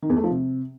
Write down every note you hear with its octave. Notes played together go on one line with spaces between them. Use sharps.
D#3
E2
A3
F3
C3